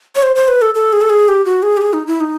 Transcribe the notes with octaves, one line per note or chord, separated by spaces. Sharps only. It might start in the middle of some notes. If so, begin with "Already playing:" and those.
C#5
C5
C5
B4
A4
A4
G#4
A4
G#4
G4
F#4
G#4
G4
G#4
D#4
E4
D#4